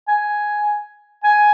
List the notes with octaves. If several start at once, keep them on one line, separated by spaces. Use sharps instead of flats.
G#5
G#5